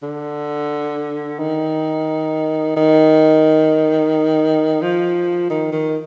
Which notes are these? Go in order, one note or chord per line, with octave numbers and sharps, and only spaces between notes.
D3
D#3
D#3
F3
D#3
D#3